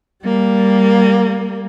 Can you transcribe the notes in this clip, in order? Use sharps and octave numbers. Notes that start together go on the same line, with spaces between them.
G3 A#3